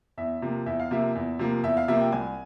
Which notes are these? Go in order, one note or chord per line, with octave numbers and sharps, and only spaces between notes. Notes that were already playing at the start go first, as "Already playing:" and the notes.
E2 E5
C3 F3 A#3
E2 E5
F5
C3 F3 A#3 E5
E2
C3 F3 A#3
E2 E5
F5
C3 F3 A#3 E5
G5
C2 G#5